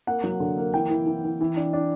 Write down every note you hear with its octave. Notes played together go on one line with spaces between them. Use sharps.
A#3 F#5
F#3
D3
A#3
E3 G5
E3
E3
E3
E3
D4
D4